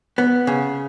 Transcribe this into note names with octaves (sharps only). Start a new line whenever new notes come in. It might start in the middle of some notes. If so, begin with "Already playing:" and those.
B3
C#3